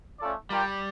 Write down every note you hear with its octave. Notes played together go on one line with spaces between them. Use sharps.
A3 C#4 F4 A4 D5
G3 F4 A#4 D5 G5